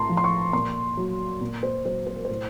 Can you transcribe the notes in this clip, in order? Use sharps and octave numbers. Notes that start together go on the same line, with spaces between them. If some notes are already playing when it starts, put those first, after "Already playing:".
Already playing: A2 A5 A#5 C6
F3
C6
C#6
A#2 C6
F#3
A#2
C5
F#3 C5
C5
A#4
A2 C5